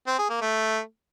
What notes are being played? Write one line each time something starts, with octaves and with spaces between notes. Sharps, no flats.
C4
G#4
A#3
A3